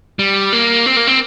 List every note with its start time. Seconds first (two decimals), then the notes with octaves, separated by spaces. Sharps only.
0.19 G3
0.53 A#3
0.86 C4
0.97 A#3
1.07 C4